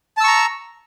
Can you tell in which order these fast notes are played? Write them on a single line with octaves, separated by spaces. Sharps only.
A5 E6 C#6 A#5